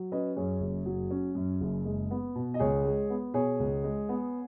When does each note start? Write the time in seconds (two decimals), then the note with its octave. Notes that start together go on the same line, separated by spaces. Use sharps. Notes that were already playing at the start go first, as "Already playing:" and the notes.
Already playing: F#3
0.12 C#4 B4 D#5
0.36 F#2 G#4 C#5
0.61 F#1
0.86 F#3
1.11 C#4
1.35 F#2
1.61 F#1
1.85 G#3
2.11 B3
2.35 B2
2.54 D#5
2.59 C#2 G#4 C#5
2.85 G#3
3.10 B3
3.34 B2 G#4 C#5
3.60 C#2
3.84 G#3
4.09 B3